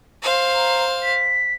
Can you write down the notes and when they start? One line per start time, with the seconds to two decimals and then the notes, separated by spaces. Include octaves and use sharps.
0.23 C5 F5
0.54 A#5
1.03 B6